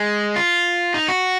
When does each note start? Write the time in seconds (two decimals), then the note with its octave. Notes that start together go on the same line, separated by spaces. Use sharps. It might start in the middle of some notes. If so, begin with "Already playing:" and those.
Already playing: G#3
0.36 F4
0.94 D#4
1.08 F#4